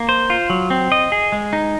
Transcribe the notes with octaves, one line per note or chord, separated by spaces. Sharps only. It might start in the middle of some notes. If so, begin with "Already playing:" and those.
Already playing: A#3
C5
F4
F#3
C4
D#5
G#4
G#3
D#4